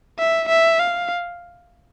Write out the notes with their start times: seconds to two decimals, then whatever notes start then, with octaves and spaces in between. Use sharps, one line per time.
0.19 E5
0.48 E5
0.79 F5